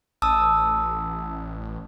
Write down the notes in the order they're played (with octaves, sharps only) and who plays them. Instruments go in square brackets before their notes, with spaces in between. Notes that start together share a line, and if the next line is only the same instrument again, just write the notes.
[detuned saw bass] A1 [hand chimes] A5 D#6 E6